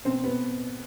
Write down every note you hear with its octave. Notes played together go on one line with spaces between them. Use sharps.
B2 C4 C5
B3 B4